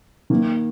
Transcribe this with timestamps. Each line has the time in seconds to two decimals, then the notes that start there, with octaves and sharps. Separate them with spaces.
0.30 D#3 A#3